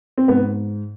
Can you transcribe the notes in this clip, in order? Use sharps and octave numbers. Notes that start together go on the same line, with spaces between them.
C4
G#2 B3